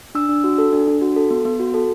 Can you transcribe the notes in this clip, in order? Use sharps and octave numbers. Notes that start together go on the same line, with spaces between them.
D4 E6
D4
F#4
A4
D4
D4
F#4
A4
B3
B3
F#4
A4